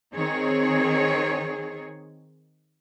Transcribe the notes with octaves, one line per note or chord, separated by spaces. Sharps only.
D#3 C4 G#4 C#5